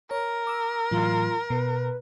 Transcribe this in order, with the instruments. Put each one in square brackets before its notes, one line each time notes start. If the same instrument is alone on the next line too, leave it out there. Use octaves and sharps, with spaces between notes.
[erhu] A#4 [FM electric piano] C#5
[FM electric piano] D6 E6
[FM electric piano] A2 E3 F#3 [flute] F4
[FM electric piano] B2 [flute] B4